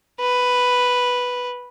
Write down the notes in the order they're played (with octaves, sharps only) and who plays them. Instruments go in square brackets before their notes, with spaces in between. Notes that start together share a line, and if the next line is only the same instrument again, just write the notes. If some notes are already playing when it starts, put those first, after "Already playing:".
[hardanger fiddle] B4